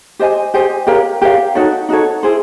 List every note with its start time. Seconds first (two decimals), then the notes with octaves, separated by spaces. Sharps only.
0.19 G4 C5 D#5 G#5
0.54 G4 C5 D#5 G#5
0.87 G4 A#4 C#5 F5
1.22 G4 A#4 C#5 F5
1.55 D#4 F#4 A4 C#5
1.89 D#4 F#4 A4 C#5
2.23 E4 G#4 C5